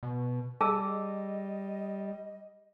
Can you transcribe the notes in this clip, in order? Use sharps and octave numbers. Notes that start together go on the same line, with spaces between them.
B2
G3 G#4 D#5 A5 E6